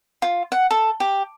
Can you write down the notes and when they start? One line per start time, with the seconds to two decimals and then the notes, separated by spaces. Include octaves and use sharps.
0.22 F4
0.52 F#5
0.71 A4
1.00 G4